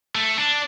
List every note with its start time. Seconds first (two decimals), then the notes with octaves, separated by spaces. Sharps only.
0.15 A3
0.38 D4